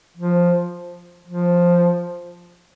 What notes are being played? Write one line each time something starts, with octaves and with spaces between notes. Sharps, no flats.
F3
F3